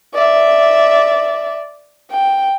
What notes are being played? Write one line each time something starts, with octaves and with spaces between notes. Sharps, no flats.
D5 E5
G5